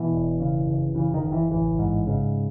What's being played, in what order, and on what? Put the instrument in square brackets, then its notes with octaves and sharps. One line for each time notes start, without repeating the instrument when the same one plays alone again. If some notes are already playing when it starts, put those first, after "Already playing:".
Already playing: [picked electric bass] B2 E3
E1
C#3
F#1
C#3 E3
D#3
F#1
E3
A1 E3
G#2
C#3